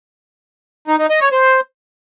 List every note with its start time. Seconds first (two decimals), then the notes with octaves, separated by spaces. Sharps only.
0.88 D#4
0.99 D#4
1.10 D#5
1.21 C#5
1.32 C5